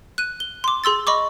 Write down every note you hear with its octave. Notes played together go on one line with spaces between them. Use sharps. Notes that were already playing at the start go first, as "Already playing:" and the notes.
F#6 D#7
G7
C6 D6
G#4 C6 E6 A6
D#5 B5 C#6 D6